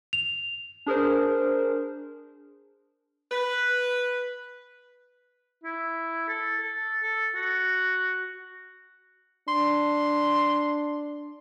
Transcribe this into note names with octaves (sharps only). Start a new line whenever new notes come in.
F7
D4 G#4 A#4 C5
B4
E4
A4
A4
A4
F#4
D4 C6